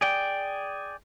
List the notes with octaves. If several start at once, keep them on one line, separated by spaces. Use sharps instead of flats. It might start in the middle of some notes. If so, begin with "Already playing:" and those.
G#4 D5 G5